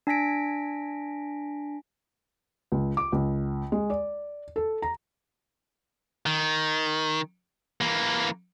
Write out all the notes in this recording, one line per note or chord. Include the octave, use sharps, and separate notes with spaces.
D4 G#5 A#6 B6 D7
C#2
D6
C#2
G#3
D5
A4
A#5
D#3
E3 A#3